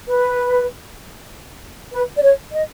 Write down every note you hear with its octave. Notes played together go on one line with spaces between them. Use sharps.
B4
B4
D5
C#5
D#5